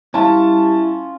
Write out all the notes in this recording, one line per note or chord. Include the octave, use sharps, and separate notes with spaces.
G3 C#4 E4 F4 A5